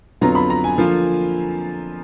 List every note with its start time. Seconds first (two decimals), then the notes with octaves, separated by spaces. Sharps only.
0.21 F2 D3 F#3 B3 F4 A#5
0.35 B5
0.50 A#5
0.64 G#5
0.78 D3 F3 A#3 F4